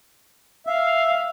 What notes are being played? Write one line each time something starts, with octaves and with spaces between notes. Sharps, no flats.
E5 F5